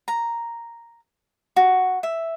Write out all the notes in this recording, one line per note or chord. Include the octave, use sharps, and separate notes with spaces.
A#5
F#4
E5